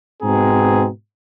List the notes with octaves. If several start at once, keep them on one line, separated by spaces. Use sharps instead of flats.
G#2 B2 C4 G#4 A#5